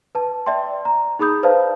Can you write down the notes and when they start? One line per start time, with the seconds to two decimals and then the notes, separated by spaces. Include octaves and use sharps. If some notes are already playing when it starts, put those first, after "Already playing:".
0.15 B4 A5
0.46 D5 E5 G5 C6
0.85 A#5
1.19 D#4 G#4 B5 D#6 G6
1.43 B4 C5 D5 F5 A5